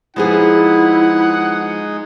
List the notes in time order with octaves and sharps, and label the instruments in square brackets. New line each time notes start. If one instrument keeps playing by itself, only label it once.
[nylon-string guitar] F3 B3 G#4 [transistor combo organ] G#3 D#4 [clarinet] E4 [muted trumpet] F#5